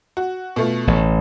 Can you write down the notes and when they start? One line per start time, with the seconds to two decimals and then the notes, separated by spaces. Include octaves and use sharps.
0.17 F#4
0.56 B2 A3 F4
0.87 A1